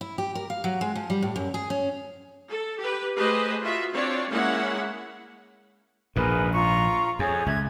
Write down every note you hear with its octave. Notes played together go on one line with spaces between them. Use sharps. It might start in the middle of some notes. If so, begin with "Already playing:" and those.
E4
G4
A#4
F5
F#3
G#3
F3
G3
A2
F#2
G#4
C#4
A4
G4 B4
A3 G4 G#4 B4 C5 D#5
F4 F#4 E5
C4 D4 F4 C#5 D5
G#3 A#3 C#4 E4 C#5 F#5
A#1 G#2 G#4 A#4 B4
F4 A#5 C#6
F2 G#4 C#5
C#2 E5 G#6